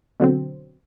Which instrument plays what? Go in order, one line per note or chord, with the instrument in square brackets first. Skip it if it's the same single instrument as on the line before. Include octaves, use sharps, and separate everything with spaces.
[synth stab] B2 D3 F#3 C4